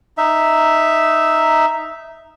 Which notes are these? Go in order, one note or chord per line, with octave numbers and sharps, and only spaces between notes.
D#4 E5